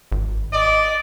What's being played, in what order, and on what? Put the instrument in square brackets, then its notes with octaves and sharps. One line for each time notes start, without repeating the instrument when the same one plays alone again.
[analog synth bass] G#1
[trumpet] D5 [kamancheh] D#5